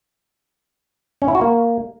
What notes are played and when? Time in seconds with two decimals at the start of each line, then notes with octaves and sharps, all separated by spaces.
1.22 C#4
1.28 E4
1.35 F#4
1.41 A#3